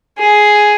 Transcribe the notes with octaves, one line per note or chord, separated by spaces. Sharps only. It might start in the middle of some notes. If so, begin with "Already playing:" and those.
G#4